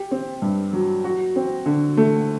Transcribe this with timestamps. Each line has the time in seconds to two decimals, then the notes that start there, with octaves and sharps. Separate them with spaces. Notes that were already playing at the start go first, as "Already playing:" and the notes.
Already playing: G4
0.11 C4
0.42 G2
0.73 F#3
1.04 F#4
1.36 C4
1.66 D3
1.97 A3